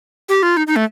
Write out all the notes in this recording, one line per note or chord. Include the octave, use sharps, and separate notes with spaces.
G4
F4
D#4
D#4
A3